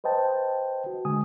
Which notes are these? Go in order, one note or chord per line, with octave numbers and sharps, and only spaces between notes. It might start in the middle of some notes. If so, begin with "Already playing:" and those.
B4 C5 D#5 G5 A5
F#4
D3 G#3 G#5 D#6